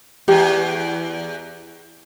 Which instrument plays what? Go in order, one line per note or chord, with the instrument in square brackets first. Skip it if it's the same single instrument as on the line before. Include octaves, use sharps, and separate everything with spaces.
[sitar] E2 [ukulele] G4